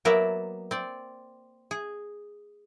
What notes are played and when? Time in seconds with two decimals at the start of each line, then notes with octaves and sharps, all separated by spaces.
0.05 F#3 A#3 B3 A#4 D5 E5
0.71 C4 D5
1.71 G#4